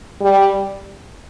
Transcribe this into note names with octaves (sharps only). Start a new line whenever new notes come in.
G3